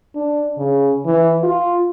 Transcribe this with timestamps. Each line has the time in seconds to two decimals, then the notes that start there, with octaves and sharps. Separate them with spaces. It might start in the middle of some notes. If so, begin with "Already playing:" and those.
0.15 D4
0.57 C#3
1.06 E3
1.43 F4